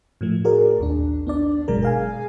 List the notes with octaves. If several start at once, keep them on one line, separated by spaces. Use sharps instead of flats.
A2 F3 A3
F#4 G#4 A#4 D5
A#1 D#2 D4
B3 D4 D5
G1 B2 F#3 G#3 A#4
G#4 F5 G#5